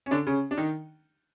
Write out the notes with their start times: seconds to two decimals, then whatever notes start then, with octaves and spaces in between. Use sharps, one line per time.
0.06 C#4
0.11 D3 D4
0.27 C#3 C#4
0.51 D4
0.57 D#3 D#4